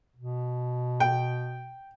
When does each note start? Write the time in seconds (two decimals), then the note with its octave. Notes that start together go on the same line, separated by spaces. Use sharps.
0.16 B2
1.00 G5